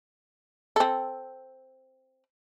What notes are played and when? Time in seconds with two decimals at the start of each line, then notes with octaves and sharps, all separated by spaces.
0.76 C4 A4